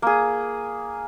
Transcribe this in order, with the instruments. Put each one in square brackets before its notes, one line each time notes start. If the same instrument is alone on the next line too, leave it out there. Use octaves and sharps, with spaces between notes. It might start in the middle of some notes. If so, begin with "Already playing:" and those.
[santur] A#3 G#4